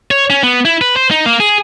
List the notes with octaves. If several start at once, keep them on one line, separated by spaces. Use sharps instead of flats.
C#5
C#4
B3
E4
B4
C5
D#4
A#3
G#4